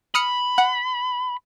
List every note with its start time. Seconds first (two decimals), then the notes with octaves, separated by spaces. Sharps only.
0.15 B5 D#6 F6 C#7
0.58 F#5